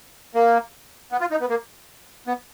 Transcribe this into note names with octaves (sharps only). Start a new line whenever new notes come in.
A#3
B3
F4
D#4
B3
A#3
B3